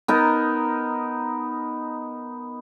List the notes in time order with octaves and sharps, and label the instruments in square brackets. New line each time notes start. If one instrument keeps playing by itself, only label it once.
[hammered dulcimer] B3 D#4 A#4